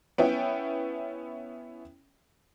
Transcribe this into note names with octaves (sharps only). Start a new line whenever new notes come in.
B3 C#4 E4 G5